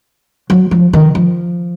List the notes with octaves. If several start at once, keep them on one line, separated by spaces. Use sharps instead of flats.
F#3
F3
D#3
F3